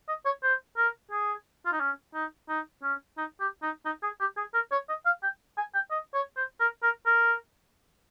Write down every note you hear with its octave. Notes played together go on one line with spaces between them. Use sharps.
D#5
C#5
C5
A#4
G#4
F4
D#4
C#4
D#4
D#4
C#4
D#4
G4
D#4
D#4
G#4
G4
G#4
A#4
C#5
D#5
F5
G5
G#5
G5
D#5
C#5
C5
A#4
A#4
A#4